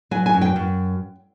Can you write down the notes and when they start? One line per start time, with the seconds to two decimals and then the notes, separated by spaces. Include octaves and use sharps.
0.11 F#3 G#5
0.26 G#5
0.34 F#2
0.41 G5
0.56 F#2